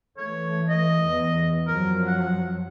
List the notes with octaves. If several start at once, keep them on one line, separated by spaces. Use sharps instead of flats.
E3 A3 C#5
D#5
E2
F#2 F3 F#3 A#4
F#5